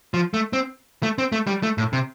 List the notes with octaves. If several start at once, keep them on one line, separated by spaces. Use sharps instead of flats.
F3
A3
C4
A3
C4
A3
G3
A3
A2
C3